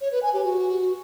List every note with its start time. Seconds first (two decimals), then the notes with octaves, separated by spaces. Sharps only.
0.01 C#5
0.12 B4
0.23 G#5
0.34 G4
0.44 F#4